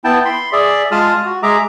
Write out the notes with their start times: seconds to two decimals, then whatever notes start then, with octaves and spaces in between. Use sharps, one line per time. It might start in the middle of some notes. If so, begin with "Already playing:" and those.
0.04 B3 E4 G5 A5
0.25 B5 C6
0.53 G#4 D5 E5
0.91 G#3 F4 G#4 A5 D#6 F6
1.25 F#4
1.43 G#3 G#4 E5 A#5 D6